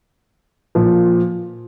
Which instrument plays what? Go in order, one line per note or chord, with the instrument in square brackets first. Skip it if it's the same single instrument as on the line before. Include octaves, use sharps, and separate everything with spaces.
[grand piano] A#2 F3